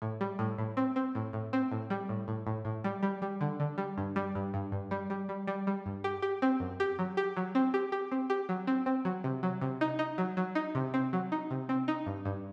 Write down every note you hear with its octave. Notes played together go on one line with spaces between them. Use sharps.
A2
G3
A2
A2
C4
C4
A2
A2
C4
A2
G3
A2
A2
A2
A2
G3
G3
G3
D3
D3
G3
G2
G3
G2
G2
G2
G3
G3
G3
G3
G3
G2
G4
G4
C4
F#2
G4
F#3
G4
F#3
C4
G4
G4
C4
G4
F#3
C4
C4
F#3
C3
F#3
C3
D#4
D#4
F#3
F#3
D#4
C3
C4
F#3
D#4
C3
C4
D#4
G2
G2